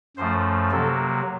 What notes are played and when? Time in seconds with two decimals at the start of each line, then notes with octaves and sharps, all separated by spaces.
0.17 F#2 F3 A3 C5
0.71 C3 F#3 A#3 A4